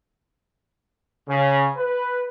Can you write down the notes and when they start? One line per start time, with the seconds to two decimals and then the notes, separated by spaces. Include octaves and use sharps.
1.28 C#3
1.76 B4